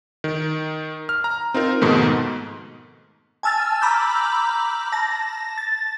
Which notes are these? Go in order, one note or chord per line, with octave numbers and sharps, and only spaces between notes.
D#3
F6
A#5
C4 D#4 F4 A#4
F2 G#2 B2 D#3 A3
G#5 A5 E6 F6 A6
A#5 B5 D6 E6 F6 G6
A5 A#6
A6